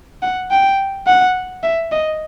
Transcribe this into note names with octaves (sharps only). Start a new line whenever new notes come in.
F#5
G5
F#5
E5
D#5